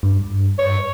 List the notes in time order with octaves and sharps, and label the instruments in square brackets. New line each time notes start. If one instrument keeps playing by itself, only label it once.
[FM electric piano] G2
[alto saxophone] C#5